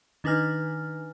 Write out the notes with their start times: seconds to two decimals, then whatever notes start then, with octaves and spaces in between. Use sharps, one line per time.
0.24 D#3 D4 D#4 B4 G#5 F6